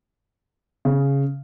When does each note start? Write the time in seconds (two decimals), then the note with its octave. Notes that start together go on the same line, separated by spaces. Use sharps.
0.85 C#3